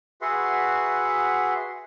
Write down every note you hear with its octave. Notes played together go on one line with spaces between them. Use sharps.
F#4 G#4 B4 E5 F#5 C6